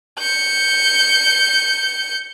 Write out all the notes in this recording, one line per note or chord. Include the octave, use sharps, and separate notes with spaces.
G6 C#7